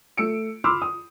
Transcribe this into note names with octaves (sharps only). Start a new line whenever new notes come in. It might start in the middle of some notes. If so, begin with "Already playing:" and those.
A3 E6 C#7 D7
B5 C6 D6 E6 F6
D#6